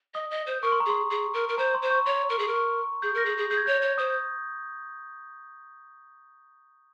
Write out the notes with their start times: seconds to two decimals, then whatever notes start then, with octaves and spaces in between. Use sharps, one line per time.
0.14 D#5 D#6
0.31 D#5
0.47 C5
0.62 A#4 C#6
0.72 C6
0.80 A#5
0.86 G#4 C6
1.10 G#4
1.34 A#4
1.49 A#4
1.58 C5 A#5
1.75 C6
1.82 C5
1.91 C#6
2.06 C#5 C6
2.30 A#4
2.39 G#4
2.48 A#4
2.54 C#6
3.02 G#4 G6
3.15 A#4 A#6
3.26 G#4
3.38 G#4
3.51 G#4 G6
3.57 G#6
3.66 C#5 G6
3.82 C#5
3.98 C5 D#6